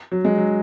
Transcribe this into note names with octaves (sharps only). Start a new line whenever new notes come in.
F#3
G#3
F#3